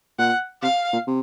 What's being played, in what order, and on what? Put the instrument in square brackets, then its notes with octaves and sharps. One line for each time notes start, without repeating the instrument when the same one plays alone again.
[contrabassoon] A#2 [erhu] F#5
[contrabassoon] C3 [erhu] F5
[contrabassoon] A#2
C3